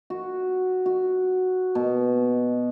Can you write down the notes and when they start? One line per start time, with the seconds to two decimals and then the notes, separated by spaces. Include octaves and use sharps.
0.10 F#4
0.86 F#4
1.75 B2